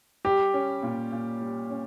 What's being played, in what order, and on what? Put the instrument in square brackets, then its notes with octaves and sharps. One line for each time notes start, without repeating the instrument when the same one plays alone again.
[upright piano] G3 [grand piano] G4
[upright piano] C#4
A#2
A#2
G3
C#4